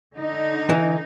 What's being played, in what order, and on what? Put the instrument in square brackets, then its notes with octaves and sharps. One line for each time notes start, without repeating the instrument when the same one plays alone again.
[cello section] D3 D#4
[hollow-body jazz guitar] E3